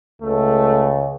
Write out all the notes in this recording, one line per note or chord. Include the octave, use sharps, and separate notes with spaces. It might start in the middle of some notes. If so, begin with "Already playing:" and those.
C#2 A3